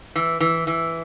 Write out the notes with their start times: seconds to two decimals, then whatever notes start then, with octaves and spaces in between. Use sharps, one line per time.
0.16 E3
0.40 E3
0.67 E3